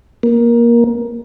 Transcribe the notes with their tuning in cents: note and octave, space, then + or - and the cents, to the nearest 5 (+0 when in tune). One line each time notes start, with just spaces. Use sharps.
A#3 +15